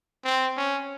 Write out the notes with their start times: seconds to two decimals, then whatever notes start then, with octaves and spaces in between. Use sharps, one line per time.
0.25 C4
0.57 C#4